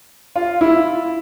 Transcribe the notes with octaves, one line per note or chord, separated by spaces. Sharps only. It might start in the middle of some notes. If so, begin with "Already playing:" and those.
F4
E4